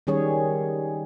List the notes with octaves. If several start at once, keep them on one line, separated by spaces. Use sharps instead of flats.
D#3 G3 C#4 G#4 C#5